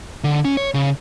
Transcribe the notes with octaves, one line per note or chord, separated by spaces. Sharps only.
D3
C#4
C#5
C#3